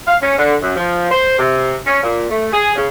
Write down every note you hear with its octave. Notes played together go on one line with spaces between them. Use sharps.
F5
C#4
D3
F#2
F3
C5
C3
C#4
A#2
A3
G#4
C#3